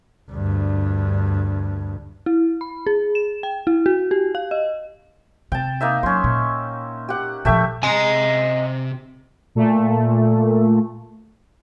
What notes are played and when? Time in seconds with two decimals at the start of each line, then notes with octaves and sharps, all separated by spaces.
0.31 D2 G2
2.26 E4
2.61 B5
2.87 G#4
3.15 E7
3.43 G5
3.67 E4
3.86 F#4
4.11 G4
4.35 F5
4.51 D#5
5.52 C3 G5 A5
5.81 A#3 D#4 E5
6.03 F#3 C#4 C6
6.24 A#2
7.08 G4 F#5
7.45 A#2 F3 A3 G4 E5
7.83 C3 D#5 G#5 A#5
9.55 A#2 A3